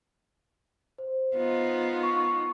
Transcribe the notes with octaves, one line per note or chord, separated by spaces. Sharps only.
C5
B3 D#4 F4
C#6